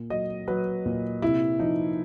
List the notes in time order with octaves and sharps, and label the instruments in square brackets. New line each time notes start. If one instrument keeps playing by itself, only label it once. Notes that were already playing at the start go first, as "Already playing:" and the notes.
Already playing: [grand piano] A#2
F#3 D#5
F#3 B4
A#2
C3 E4
F3 D#4